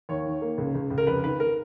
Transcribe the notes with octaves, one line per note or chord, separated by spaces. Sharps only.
D#2 C#5
D#3
A#3
C#2
C#2
C#2
A#4
F1 B4
D#3 B4
A#4